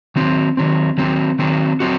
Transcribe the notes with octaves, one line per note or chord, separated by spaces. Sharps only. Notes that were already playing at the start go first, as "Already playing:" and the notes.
D#3 F#3 C4
D#3 F#3 C4
D#3 F#3 C4
D#3 F#3 C4
F#3 C4 F#4